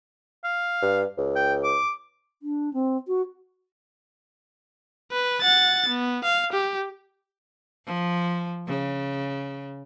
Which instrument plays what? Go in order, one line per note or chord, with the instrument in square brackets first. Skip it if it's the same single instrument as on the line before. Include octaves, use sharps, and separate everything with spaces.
[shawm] F5
[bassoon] G2
C#2
[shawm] G5
D6
[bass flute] D4
C4
F#4
[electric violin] B4
F#5 A6
B3
F5
G4
[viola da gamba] F3
C#3